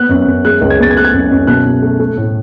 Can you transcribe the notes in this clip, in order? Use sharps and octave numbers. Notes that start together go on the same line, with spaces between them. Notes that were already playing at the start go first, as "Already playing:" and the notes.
Already playing: B3 F#6
F#2
F#2
G#3 F#6
C#2
G#6
B3 A6
G#6
A3 F#6
G#6
F#2
F#2
B2 F#6
B2
A3
A3
A2